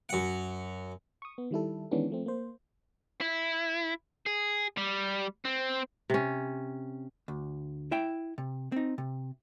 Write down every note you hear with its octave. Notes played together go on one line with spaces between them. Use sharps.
F#2 F#5
C#6 D#6
B3
D#3 G3 E4 A4
D#3 E3 G#3 B3 C#4 D4
F3 A3 C4
A#3 C5
E4
G#4
G3
C4
C3 C#4
D2
E4 E5 G5
C3
C4 D#4
C3